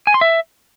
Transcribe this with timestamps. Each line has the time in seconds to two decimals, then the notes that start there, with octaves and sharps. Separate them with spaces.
0.07 G#5
0.14 C6
0.21 E5